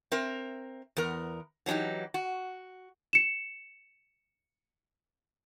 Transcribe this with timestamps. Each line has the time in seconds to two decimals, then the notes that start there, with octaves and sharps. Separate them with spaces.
0.12 C4 A#4 E5
0.97 E2 B3 A#4
1.66 E3 F#3 D4 D#4 G4
2.14 F#4
3.13 C#7 E7